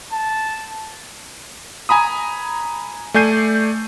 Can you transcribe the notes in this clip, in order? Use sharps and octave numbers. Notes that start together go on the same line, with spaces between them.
A5
G#5 A#5 B5 D#6
A3 D5 G#5 G6 C7 D#7